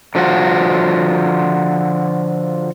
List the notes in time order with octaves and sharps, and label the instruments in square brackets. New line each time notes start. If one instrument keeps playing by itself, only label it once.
[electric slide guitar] D3 F3 F4 F#4